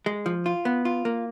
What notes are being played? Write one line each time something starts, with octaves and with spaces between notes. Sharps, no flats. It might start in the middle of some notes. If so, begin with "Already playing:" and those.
G#3
F3
F4
B3
F4
A#3